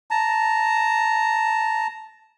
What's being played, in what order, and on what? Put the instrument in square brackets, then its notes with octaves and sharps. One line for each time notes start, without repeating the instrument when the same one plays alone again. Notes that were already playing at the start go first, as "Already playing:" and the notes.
[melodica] A5 A#5